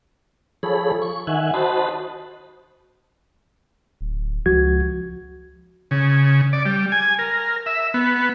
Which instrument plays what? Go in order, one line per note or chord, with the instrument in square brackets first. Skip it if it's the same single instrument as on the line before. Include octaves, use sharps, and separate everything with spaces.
[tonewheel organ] F3 G#4 A4 C#5 B5
C#6
D#3 E5 F#5 G#5
F#4 C5 D#5 A5 B5
[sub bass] D1
[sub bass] C#2 [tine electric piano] F3 F#4 G#6
[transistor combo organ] C#3
D5
G3
G#5
A#4
E5
B3